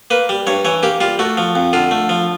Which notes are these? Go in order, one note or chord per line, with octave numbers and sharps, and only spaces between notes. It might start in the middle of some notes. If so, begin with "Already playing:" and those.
A#3 B4
G3
G2 C#5
E3 C#5
A#3 G4
G3 F4
A3 F#4
F3
F2
D3 F4
A3
F3